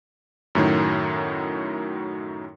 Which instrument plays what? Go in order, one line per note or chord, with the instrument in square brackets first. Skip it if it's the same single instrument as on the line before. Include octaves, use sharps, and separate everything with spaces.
[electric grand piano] F#2 A2 D#3 F#3